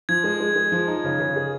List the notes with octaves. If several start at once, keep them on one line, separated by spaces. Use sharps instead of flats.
F3 G#6
G#3
G#3
G#3
F3
D#4
C#3
C#3
G#4